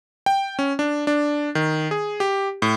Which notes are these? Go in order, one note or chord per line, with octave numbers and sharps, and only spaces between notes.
G5
C#4
D4
D4
D#3
G#4
G4
A2